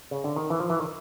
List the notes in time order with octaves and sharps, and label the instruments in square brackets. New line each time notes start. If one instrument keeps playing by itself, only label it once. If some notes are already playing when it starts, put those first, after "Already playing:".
[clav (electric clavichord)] C#3
D3
D#3
E3
F3
E3
D#3